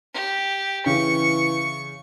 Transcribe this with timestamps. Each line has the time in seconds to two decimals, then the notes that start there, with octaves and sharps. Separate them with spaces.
0.14 G4
0.86 C#3 E3 C#6